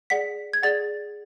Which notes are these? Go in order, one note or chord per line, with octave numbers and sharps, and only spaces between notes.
G#4 D5 F#5 B6
G#6
G#4 D5 F#5 A6